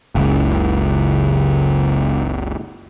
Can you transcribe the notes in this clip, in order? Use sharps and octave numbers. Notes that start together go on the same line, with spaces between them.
F#1 C#2